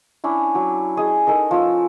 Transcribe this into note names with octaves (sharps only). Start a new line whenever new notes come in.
C#4 D4 E4
F#3
G#4 D#5 G#5
D#4 A4 A#4 D#5
F3 C#4 E6